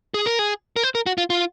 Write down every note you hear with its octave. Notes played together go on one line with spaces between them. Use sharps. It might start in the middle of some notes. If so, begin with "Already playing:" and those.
G#4
A#4
G#4
A#4
C5
A#4
F#4
F4
F4